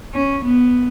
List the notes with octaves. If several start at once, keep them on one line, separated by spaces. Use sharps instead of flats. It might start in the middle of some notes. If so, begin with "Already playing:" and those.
C#4
B3